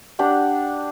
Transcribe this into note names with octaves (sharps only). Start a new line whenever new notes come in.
D4 G4 F#5